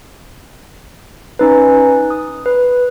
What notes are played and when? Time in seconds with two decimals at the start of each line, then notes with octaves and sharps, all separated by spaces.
1.39 C#4 D#4 B4
2.10 D#6
2.46 B4